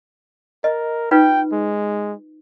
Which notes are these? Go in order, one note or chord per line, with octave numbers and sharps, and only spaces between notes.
A#4 D#5
D#4 F4 B4 G5
G#3